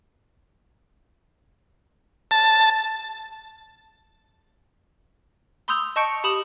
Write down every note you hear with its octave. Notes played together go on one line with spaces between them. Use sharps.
A5
B5 C6 D#6 E6 G6 F7
D#5 A5 C#6 G6 C#7 D7
G4 B5 D#6 E7 F#7